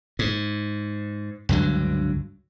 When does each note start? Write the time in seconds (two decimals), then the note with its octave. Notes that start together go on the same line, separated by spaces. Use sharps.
0.19 G#2
1.49 C#2 G2 D3 F#3